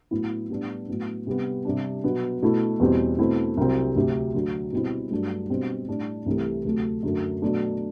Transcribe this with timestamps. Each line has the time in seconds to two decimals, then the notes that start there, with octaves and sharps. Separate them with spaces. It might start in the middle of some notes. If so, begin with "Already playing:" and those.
0.11 A2 F#3 B3 E4
0.50 A2 G3 B3 D4
0.89 A2 F#3 B3
1.27 C3 G3 B3
1.65 C3 G3 D4
2.04 B2 F#3 B3
2.42 B2 A3 E4
2.80 E2 B2 G3 C4
3.19 B2 A3 C4 E4
3.57 C2 C3 F#3 C4
3.96 D2 C3 F#3
4.34 D2 D3 F#3
4.72 B2 G3 C4 E4
5.11 G2 F#3 A3 D4
5.50 B2 G3 C4
5.88 A2 G3 D4
6.26 C2 C3 E3 A3
6.65 D2 C3 F#3 A3
7.03 F#2 D3 F#3 A3
7.42 B2 F#3 A3 D4